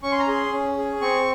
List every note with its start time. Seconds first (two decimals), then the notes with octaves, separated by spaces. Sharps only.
0.03 C#4 C#6
0.12 C6
0.19 A#5
0.27 G#4 C6
0.53 C#4
0.77 G#4
1.01 C4 C#6